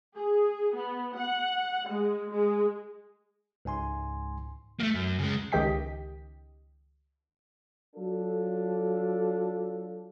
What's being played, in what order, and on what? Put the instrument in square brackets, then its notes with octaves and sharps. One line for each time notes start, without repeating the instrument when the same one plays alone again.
[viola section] G#4
B3
F#5
G#3
G#3
[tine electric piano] C#2 G#2 G#5 C6
[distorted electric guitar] A3 A#3
F#2
C#3 G#3
[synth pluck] C#2 D#3 G4 D#5 G5 B6
[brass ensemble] F#3 D4 F4 A4